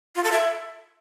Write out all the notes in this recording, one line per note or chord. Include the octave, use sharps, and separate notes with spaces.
F4
A4
E5